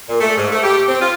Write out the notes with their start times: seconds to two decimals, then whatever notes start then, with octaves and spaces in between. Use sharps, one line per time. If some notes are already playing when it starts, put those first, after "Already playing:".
0.09 A#2
0.20 A3
0.37 G#2
0.52 A3
0.64 G4
0.89 C4
1.01 F4